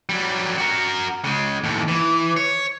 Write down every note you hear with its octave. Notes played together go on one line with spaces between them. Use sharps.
F#3 G3
F#4 A#4
C#3 G#3
D#2 A2
E3
C#5